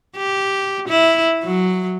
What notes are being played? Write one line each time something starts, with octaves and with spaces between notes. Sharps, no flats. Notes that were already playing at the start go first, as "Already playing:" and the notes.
G4
E4
F#3